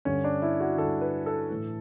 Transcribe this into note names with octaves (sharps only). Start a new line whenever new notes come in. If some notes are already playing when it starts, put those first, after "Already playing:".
G2 D3 C#4
D4
E4
F#4
G2 D3 A4
B4
A4
A2 E3